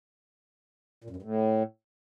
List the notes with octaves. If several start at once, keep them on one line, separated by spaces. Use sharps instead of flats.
A#2
F#2
G2
A2